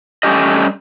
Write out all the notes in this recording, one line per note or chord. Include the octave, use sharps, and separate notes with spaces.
G3 A3 C#4 G4 D#5